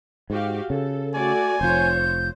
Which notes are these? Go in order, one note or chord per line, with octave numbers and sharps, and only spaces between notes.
G#2 F#4 G4 F5
C#3 A4
A3 F#4 D5 G#5
F1 F3 C5 C#5 G6